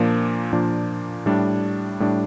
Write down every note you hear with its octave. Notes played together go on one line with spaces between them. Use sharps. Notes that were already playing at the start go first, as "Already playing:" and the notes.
Already playing: A#2 F3 A#3 D4
A#2 F3 A#3 D4
A2 G3 D4
A2 G3 D4